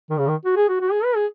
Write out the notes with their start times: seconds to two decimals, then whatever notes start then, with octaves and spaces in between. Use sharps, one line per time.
0.10 D#3
0.19 C#3
0.27 D#3
0.45 F#4
0.56 G#4
0.69 F#4
0.81 F#4
0.92 G#4
1.04 B4
1.16 G#4